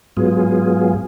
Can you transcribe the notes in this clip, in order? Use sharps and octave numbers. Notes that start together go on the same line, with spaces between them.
G#2 F#3 B3 F4 G#4